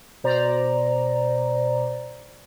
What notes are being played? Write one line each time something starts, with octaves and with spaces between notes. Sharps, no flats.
B2 C5 D5 A#5